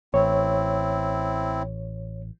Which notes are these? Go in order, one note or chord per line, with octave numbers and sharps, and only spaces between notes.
A1 C4 E4 C#5